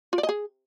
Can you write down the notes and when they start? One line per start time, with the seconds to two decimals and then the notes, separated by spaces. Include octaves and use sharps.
0.13 F4
0.18 D5
0.23 D#5
0.29 G#4